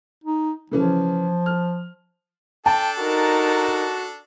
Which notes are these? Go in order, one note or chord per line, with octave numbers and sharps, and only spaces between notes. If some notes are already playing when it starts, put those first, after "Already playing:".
D#4
C#3 E3 F3 C#4
F6
D4 A4 G5 A5
D#4 F#4 A#4